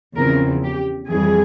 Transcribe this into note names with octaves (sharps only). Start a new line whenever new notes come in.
E2 C#3 F3 C4 A#4
G4
F2 E3 G3 G#4